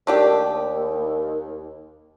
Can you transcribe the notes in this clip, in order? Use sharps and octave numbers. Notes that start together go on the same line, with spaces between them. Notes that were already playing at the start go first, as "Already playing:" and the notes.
D#2 A3 D4 G4